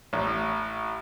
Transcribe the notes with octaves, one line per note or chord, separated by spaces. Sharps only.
A1